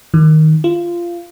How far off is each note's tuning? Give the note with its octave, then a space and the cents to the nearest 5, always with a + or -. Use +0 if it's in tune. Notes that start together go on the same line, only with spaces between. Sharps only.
D#3 +5
F4 -15